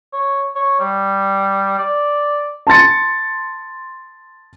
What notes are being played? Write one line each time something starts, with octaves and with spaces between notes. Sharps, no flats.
C#5
C#5
G3
D5
A5 C6 A6 C#7